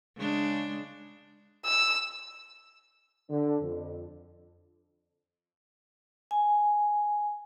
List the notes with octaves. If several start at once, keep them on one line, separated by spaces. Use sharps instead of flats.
C#3 G#3 D4
E6
D3
F2
G#5